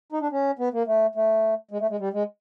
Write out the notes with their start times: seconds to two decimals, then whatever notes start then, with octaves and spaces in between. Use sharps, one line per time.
0.12 D#4
0.21 D4
0.32 C#4
0.59 B3
0.73 A#3
0.87 A3
1.15 A3
1.71 G#3
1.80 A3
1.90 G#3
1.99 G3
2.13 G#3